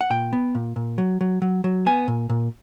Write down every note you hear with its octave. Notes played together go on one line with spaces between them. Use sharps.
F#5
A#2 G5
B3
A#2
A#2
F#3
F#3
F#3
F#3
B3 G#5
A#2
A#2